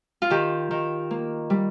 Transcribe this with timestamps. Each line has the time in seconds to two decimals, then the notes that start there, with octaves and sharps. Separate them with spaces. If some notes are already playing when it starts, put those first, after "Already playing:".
0.22 F4
0.30 D#3 G4
0.71 D#3
1.11 A#3
1.50 G3